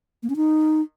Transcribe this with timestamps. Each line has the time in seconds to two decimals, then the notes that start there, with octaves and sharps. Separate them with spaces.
0.23 A#3
0.30 C#4
0.36 D#4